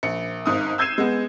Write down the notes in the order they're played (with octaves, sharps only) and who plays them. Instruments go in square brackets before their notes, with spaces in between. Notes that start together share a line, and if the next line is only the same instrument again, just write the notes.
[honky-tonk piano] A#1 C#7
G#1 G#2 D#6
E6 G6 G#6 C7 D#7 E7
G#3 B3